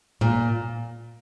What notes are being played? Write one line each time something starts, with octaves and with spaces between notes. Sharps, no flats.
A#2